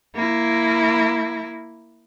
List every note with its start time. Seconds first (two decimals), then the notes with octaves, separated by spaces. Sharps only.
0.15 A#3 E4